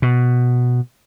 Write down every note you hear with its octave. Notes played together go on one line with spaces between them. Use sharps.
B2